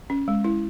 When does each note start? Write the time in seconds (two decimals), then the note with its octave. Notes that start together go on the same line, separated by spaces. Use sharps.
0.10 C#4
0.28 G#3
0.44 E4